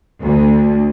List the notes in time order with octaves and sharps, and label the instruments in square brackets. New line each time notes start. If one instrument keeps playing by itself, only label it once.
[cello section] D2